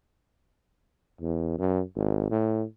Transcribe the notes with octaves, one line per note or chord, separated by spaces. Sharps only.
E2
F#2
G#1
A2